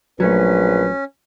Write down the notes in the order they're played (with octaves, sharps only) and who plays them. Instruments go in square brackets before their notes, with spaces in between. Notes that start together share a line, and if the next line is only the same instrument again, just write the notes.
[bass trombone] A#1 [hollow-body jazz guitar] F#3 A3 [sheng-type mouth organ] C#4 [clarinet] B4